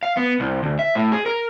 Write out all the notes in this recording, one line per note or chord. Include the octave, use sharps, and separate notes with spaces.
F5
B3
C2
D2
E5
A2
G#4
A#4